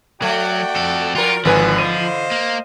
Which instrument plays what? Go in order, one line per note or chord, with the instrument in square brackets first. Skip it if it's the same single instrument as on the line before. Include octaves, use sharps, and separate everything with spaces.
[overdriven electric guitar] F#3 [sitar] A3 [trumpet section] F#4 D5 G5
[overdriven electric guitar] F2 A4
[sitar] F3 A#4 [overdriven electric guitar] F4
[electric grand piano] G#1 B4 G#5 [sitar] D3 E3 [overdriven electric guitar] F3
[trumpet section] C5 D#5 F5 [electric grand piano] D#7
[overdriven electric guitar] A#3